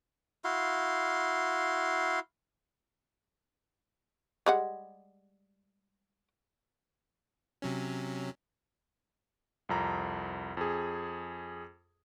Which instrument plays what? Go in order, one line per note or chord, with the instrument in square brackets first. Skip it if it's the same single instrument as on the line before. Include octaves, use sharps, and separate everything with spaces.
[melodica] E4 F#4 F5 C6
[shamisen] G3 G#3 F#5
[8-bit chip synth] C3 F#3 C#4
[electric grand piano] C2 F2 A#5
F2 G#4